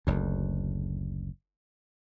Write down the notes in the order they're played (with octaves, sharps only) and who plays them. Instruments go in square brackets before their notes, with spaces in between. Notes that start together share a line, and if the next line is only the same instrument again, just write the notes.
[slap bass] F#1 D2